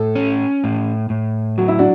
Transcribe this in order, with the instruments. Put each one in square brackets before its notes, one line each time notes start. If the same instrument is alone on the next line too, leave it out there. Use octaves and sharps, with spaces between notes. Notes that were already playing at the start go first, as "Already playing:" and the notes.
Already playing: [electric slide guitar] A2 [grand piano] A4
[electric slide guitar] C#4
A2
A2
[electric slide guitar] F#3 [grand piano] F#4
[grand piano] E4
D4 F#4